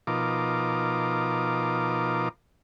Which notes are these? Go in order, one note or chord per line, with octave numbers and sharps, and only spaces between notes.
B2 F3 D#4 F4 A#4 D6